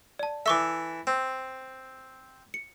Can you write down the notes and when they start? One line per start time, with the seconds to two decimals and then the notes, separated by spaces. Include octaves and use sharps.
0.19 D5 A5
0.46 E3 A4 E5 C#6 D6
1.07 C4
2.54 C#7